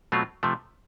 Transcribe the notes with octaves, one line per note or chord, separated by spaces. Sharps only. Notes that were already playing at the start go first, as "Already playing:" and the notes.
B2 F#3 A3 C4 F4
C3 F3 A3